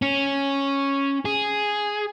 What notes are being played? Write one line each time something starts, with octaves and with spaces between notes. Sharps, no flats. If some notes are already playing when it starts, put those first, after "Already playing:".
C#4
G#4